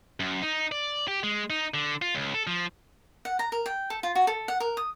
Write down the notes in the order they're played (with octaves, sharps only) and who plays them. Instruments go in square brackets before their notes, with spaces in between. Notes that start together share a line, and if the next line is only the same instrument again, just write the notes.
[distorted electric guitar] F#2
D#4
D5
G4
G#3
D#4
D3
F4
C#2
A4
F3
[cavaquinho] F#5
A#5
A#4
G5
A4
F4
F#4
A4
F#5
A#4
D#6